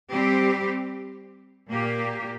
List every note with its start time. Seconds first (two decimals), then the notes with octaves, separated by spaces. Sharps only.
0.10 G3 C4 G4
1.70 A#2 A#3 G4